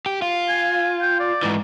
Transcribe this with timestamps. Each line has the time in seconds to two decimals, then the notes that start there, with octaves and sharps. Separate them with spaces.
0.06 G4
0.22 F4
0.49 G#5
1.02 G5
1.20 D5
1.43 G#2 E3